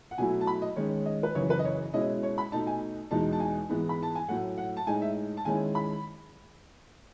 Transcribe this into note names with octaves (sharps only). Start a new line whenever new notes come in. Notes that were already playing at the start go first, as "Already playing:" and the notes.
F#5
B2 F#3 A3 E4 G#5
A5
B5
D#5
D#3 G#3 C#4 C#5
D#5
B4
F#2 C#3 E3 C#5
B4
D#5
C#5
B2 G#3 C#4 E4 D#5
C#5
B5
B2 A3 D#4 A5
G#5
E2 B2 G#3 D#4 A5
A5
G#5
G#2 E3 G#3 B3
B5
A5
G#5
A2 F#3 A3 F#5
F#5
A5
A2 G#3 D#4 G#5
E5
A5
D#3 G#3 C#4 E4 G#5
B5